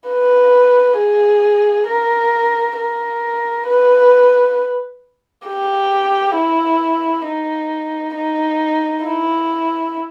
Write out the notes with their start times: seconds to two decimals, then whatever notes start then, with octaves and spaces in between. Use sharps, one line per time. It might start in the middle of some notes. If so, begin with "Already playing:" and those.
0.08 B4
0.98 G#4
1.88 A#4
2.77 A#4
3.67 B4
5.46 G4
6.36 E4
7.26 D#4
8.15 D#4
9.04 E4